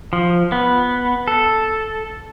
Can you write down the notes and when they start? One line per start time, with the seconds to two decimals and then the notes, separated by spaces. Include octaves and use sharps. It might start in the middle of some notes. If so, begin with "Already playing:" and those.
0.13 F3
0.52 B3
1.28 A4